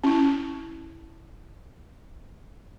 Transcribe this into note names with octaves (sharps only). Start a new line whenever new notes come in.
C#4 E4